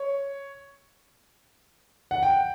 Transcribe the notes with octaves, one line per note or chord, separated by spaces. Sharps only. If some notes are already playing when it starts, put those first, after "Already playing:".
Already playing: C#5
F#5
G5